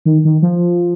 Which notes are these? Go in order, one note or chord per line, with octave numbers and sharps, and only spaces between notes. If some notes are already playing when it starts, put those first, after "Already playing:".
D#3
D#3
F3